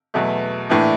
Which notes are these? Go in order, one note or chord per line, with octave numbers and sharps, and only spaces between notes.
E2 B2 F#3 A3
A#1 A2 E3 A3 D4